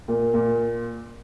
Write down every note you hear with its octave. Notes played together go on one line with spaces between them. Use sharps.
A#2
A#2